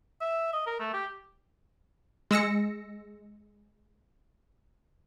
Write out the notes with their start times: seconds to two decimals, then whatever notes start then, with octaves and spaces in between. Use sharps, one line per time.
0.21 E5
0.53 D#5
0.66 A#4
0.80 A3
0.94 G4
2.31 G#3 E6 A#6 C#7